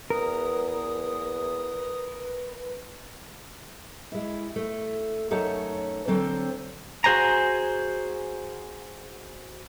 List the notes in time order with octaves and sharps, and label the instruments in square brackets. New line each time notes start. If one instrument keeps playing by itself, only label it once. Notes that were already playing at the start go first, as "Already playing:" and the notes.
[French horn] E2 [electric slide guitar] A#4 [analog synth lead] B4 [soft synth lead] D#6
[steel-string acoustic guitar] G#3 E4
A3
F#2 A3 D#4 C#5 F#5 A5
D3 F#3 C4 A4 C5
[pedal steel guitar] F#4 G#4 C5 G#5 A#5